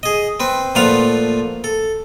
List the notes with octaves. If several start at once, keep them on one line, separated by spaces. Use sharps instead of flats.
G#4 D#5
C4 B4
A#2 F3 A3 B4 F5 F#5
A4